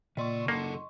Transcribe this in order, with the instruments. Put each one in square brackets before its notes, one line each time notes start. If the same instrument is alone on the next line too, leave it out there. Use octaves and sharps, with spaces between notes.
[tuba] A#2 [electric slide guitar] C#3 D5 [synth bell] D#5 C6 C#6
[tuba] F#1 [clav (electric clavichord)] A#3 [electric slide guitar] A4 F#5 A5